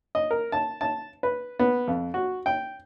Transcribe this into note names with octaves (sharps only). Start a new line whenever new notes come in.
D#5
A#4
A5
A5
B4
B3
F2
F#4
G5